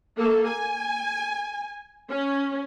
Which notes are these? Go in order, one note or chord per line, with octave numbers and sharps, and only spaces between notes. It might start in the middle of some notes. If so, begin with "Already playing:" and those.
A#3 A4
G#5
C#4